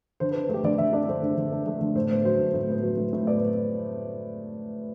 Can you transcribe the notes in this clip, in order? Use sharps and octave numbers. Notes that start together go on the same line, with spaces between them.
D3 C5
B4
D4
A3 G4
D3 D5
D3 E5
D4 D5
A3 C5
D3
D3
D4
A3
D3
A2 C5
B3 C5
F#3 C5
A2
A2
B3
F#3
A2
A2
B3 D5